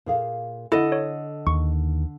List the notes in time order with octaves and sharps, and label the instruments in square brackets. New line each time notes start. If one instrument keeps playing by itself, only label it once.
[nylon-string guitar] A#2 G#4 F5
[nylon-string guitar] D3 F#5 [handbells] E4 [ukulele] A4 D#5
[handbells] C#5
[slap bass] D#2 [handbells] C#6